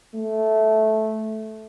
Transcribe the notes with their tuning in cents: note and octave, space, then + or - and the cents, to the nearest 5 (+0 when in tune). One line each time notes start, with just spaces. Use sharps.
A3 -10